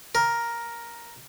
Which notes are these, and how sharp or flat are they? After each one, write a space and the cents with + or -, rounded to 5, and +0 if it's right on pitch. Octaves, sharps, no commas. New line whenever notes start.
A#4 +5